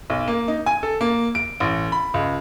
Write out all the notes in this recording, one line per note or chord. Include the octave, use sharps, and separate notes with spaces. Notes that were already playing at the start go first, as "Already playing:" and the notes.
B1
A#3
D#4
G#5
A4
A#3
D7
A1
B5
C#2